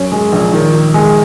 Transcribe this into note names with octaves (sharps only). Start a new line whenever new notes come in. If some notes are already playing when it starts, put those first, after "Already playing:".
Already playing: F#2 C#4
G#3
A#1
D#3
D#3
G#3